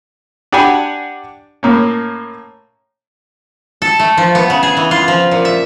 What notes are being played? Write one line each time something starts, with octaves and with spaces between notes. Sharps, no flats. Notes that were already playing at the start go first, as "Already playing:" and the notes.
D4 G4 D5 F#5 G#5 B5
A2 A#3 C#4
A4
A3
F3
B3
C#3
G#4
E3
F4
F3
A#2
E5